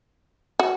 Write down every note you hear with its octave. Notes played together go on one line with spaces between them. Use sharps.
F#4